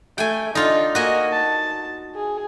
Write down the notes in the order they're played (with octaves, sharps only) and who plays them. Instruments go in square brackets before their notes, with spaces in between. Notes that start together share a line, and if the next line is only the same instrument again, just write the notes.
[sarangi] A3 [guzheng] G5 G#5
[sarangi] D3 [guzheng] D#4 F4
[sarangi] A#3 [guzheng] F#4 D#5 G#5
[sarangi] A5
G#4